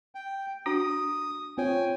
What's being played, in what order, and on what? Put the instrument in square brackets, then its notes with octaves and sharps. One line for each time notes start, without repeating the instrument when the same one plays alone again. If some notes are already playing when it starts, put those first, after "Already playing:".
[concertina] G5
[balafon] D4 F#4 [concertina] D#6
[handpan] C4 F4 C#5 [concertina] G5 G#5